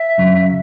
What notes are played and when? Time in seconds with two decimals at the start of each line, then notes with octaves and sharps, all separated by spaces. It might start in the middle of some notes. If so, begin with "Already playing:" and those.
Already playing: E5
0.18 F#2 C#3 F#3 C#4